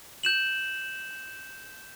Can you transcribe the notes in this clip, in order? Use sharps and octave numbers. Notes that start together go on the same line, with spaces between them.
G6 E7 F#7